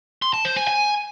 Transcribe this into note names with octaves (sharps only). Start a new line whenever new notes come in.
C6
A5
C5
G#5
G#5